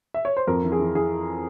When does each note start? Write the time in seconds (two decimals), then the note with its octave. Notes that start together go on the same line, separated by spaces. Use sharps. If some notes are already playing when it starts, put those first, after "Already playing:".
0.14 E5
0.25 C#5
0.37 C5
0.47 F2 A#4
0.64 E3
0.72 G#4
0.79 E3
0.95 E3 G#4